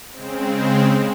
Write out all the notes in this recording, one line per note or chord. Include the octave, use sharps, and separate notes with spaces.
C#3 G#3 C4